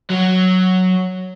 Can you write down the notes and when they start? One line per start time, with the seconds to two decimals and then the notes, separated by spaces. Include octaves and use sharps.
0.10 F#3